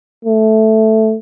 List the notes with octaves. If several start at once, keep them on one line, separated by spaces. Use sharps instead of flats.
A3